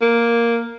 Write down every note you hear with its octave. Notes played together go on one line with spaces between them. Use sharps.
A#3